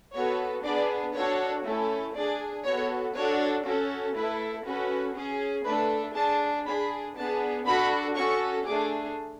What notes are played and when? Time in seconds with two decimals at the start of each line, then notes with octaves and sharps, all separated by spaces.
0.14 B3 F#4 A4 C#5
0.64 B3 D4 G#4 D5
1.14 D4 F#4 A4 C#5
1.65 A3 C#4 E4 A4
2.15 D4 G#4 D5
2.64 B3 F#4 A4 C#5
3.15 D4 F#4 A4 C#5
3.65 C#4 F#4 A4
4.15 A3 E4 A4 B4
4.65 C#4 F#4 A4 B4
5.15 C#4 G#4
5.65 A3 D4 A4 B4
6.15 D4 G#4 A5
6.65 D4 G#4 B5
7.15 B3 D4 G#4 A5
7.65 D4 F#4 A4 B5
8.15 C#4 F#4 A4 C#6
8.65 A3 D4 G#4 D6